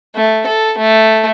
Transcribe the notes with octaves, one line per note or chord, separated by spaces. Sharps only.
A3
A4
A3